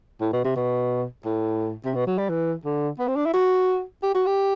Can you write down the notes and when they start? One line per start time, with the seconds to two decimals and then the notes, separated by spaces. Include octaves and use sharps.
0.21 A2
0.33 B2
0.45 C3
0.56 B2
1.25 A2
1.85 C3
1.95 B2
2.07 F#3
2.18 G3
2.29 E3
2.65 D3
2.99 B3
3.08 C4
3.16 D4
3.26 E4
3.33 F#4
4.03 G4
4.15 F#4
4.26 G4